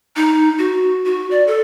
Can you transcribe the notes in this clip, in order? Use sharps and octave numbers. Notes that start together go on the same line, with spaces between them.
D#4
F#4
F#4
D5
A4